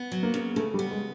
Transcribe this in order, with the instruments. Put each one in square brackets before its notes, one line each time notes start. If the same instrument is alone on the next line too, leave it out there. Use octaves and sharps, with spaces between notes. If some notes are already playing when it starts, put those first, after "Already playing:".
Already playing: [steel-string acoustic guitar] B3
F#3
[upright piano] A#3
[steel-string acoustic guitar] C#3
[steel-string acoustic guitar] C#3 [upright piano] A3
[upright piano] G3
[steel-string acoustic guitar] B3
[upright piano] G#3